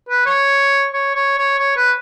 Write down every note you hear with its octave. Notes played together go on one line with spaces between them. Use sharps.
B4
C#5
C#5
C#5
C#5
C#5
B4